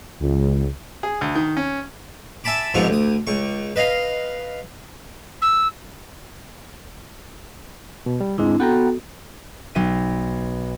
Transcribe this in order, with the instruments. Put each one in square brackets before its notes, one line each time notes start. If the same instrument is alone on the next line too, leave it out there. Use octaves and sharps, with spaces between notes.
[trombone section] C#2
[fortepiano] G#4
D2
D#3
C#4
[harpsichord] E5 G#5 A5 B5 D6
F2 G#2 C3 F3 B3 C#6
D2 D#6
C#2 C#6
B4 D#5 F5
[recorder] E6
[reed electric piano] B2
G3
[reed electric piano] D2 G#2 G#3 [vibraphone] C4 D4 E4
[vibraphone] B3 F#4 A4 [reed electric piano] F#5 G5 A#5
[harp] B1 E5 D#7